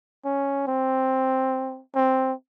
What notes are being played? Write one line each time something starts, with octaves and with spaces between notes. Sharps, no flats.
C#4
C4
C4